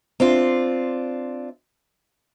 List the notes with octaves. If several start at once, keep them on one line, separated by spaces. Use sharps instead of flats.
C4 D4 F4